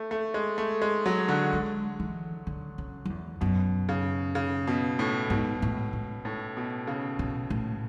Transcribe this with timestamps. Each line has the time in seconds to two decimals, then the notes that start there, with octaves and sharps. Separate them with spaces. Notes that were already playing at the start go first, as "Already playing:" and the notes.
Already playing: A3
0.11 A3
0.34 G#3
0.58 A3
0.82 G#3
1.06 F#3
1.29 D3
1.53 G#3
2.00 E3
2.47 D3
2.78 C#3
3.05 F#2
3.10 E2
3.41 F#2 B2
3.89 C#3
4.35 C#3
4.67 B2
4.99 A2
5.30 G#2 B2
5.62 A2
5.93 G#2
6.25 A2
6.57 B2
6.87 C#3
7.19 B2
7.50 A2